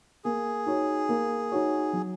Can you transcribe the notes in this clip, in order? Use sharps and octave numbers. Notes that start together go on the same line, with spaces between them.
A#3 G#4
D#4 F#4 C#5
A#3
D#4 F#4 C#5
F#3